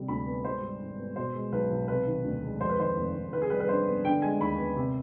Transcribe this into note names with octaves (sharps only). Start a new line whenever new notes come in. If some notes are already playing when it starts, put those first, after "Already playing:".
Already playing: C3 G3
D2 B5
B3
G#2 C5
G3
G#1
B3
B2 C5
G#3
B1 B4
B1
C3 B4
D#3
D2
G#3
F2 C5
B4
D#3 C5
F1
F1
D#3 B4
G#4
G3 B4
B4
G2 C5
B3
D3 G5
G#3 G#5
D#2 B5
B3
C3